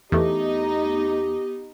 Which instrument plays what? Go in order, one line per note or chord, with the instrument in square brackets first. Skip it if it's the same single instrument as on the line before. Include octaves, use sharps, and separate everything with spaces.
[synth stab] E2 A3 [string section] B3 D#4 D#5 [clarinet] G4